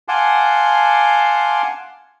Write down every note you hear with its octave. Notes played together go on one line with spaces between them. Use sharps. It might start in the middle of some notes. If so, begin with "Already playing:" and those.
F5 F#5 G#5 A5 C6 D6